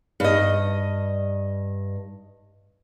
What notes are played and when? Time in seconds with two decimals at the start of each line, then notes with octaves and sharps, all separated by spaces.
0.20 G2 D#5